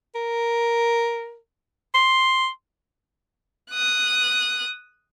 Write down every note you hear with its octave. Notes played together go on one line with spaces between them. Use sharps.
A#4
C6
D#6 F#6